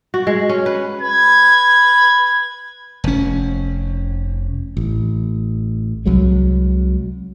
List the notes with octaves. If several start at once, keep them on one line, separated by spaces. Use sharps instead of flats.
F#4
G#3
C#4
B4
B4 G#6
F1 C#4
A1
C2 F#3 G#3